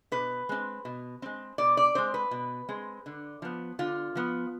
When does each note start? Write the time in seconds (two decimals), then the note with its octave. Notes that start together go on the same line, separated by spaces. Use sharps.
0.12 B2 B4
0.49 G#3 C4
0.85 B2
1.22 G#3 C4
1.58 B2 D5
1.77 D5
1.95 G#3 C4 C5
2.14 B4
2.31 B2
2.69 G#3 C4
3.06 D3
3.42 F3 B3
3.79 D3 F4
4.15 F3 B3